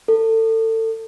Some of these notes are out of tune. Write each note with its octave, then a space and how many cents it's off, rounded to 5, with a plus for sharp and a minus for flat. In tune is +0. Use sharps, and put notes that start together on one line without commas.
A4 +30